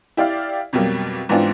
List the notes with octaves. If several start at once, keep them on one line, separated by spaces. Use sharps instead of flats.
E4 G4 D5 F5
F2 B2 F#3 G3 A#3
G#2 E3 B3 C4 D4 F4